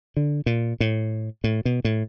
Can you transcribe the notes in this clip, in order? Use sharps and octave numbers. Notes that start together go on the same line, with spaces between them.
D3
A#2
A2
A2
B2
A2